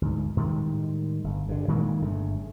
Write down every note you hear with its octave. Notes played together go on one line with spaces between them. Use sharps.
D2 G#2
A2 D#3 G3 G#3
G1
G2 D3
A#2 D#3 G#3 A#3
G1 G2 C#3 A3